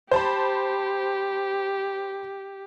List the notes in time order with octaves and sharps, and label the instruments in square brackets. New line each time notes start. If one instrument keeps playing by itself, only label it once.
[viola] G4 [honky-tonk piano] C5 A5 B5